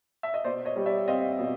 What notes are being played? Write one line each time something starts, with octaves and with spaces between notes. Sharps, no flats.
E5
D#5
B2 C5 D5
C#5 D#5
G3
D5 E5
C4 D#5 F5
B2